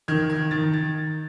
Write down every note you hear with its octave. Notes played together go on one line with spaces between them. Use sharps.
D#3 G#6
G#6
D#3 A6
A6